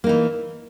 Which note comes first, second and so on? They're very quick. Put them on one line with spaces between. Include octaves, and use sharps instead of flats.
A#3 D#4 E3